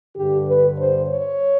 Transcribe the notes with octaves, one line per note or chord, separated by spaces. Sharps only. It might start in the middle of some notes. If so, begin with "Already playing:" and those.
G2 D3 G4
B4
C5
C#5